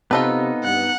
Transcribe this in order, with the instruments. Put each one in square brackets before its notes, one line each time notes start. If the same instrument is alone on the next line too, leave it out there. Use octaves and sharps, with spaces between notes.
[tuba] C3 [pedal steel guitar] B3 D#4 [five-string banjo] F4 A4 B4
[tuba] G2 [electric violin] F#5